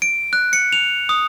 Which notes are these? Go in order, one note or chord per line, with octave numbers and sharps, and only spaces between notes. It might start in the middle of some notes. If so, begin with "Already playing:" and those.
D7
F#6
C#7
F7
D#6